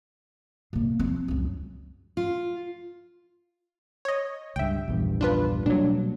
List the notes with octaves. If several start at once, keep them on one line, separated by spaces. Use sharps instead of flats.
C3 A#3
F3 C4
C#2 F#2
F4
C#5 D#5
C#2 G2 E5 G5
A#1 E2 G2
D4 F4 B4
B2 F#3 G3 A#3 D4